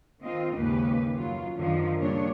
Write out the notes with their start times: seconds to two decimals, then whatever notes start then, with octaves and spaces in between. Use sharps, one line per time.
0.22 D#3 C4 F4 D#5
0.56 D#2 G#2 C#3 G4 B4
1.14 F#2 F#3 F4
1.57 F#2 D3 D#3 F3
1.98 A#2 C#3 G3 D4 C#5